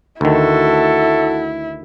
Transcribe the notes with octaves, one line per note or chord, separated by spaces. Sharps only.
D2 D#3 E4 F#4 A4